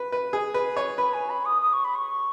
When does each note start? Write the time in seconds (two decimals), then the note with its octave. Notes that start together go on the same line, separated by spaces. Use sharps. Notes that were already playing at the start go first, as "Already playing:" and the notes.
Already playing: B4
0.12 B4
0.33 G#4
0.54 B4
0.77 C#5
0.98 B4 B5
1.14 G#5
1.30 B5
1.46 D#6
1.62 D#6
1.73 C#6
1.85 B5
1.95 C#6